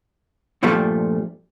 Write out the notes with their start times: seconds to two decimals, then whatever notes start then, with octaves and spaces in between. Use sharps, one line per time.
0.63 G2 A#2 F3 G3 A3